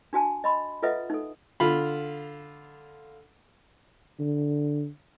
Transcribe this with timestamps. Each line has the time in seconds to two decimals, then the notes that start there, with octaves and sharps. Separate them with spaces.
0.13 D4 F#4 G#5 A5
0.44 D#5 B5 C6
0.83 F4 A4 B4 D#5 E5 F#5
1.10 D#4 A4
1.60 D3 F4 B5
4.20 D3